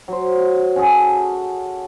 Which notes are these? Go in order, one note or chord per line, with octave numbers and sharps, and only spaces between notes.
F#3 C5
C#4 F#4 G#4 A4